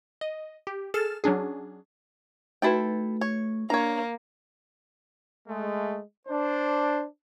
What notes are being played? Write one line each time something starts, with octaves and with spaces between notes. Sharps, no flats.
D#5
G4
G#4 A4 F6 A6 E7
F#3 C#4 D4 G#4
A3 D#4 E4 F#4 A4 B4 G5
C#5
A#3 D4 C#5 A#5
G#3 A3
D4 C5